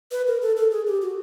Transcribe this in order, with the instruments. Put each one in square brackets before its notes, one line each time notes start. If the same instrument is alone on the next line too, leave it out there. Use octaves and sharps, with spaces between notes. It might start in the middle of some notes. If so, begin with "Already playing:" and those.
[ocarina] B4
A#4
A4
A4
G#4
G4
F#4